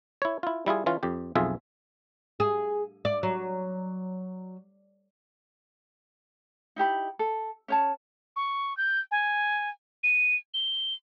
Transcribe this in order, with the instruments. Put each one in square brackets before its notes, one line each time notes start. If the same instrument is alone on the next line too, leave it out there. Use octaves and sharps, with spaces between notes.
[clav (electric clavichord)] E4 C#5
E4 F4
G3 E4 F4 G#4
E3 C#4 F4
F2 G4
B1 F2 F4 G#4 E5
[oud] G#4
D5
F#3
[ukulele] D#4 E4 G4 B5
A4
C#4 C#5 A5
[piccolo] C#6
G6
G#5
D#7
G7